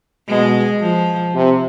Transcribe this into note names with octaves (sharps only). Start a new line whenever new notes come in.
B2 G#3
F3
C3